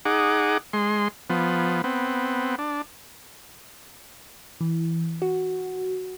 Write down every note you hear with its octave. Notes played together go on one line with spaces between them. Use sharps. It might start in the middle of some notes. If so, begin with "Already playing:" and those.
D#4 G#4 F#5 D6
G#3 C6
F3 B3
B3 C4
D4
E3
F#4